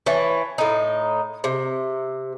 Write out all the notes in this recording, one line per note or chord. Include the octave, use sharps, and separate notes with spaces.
E3 C#5 A5
A2 D#4
C3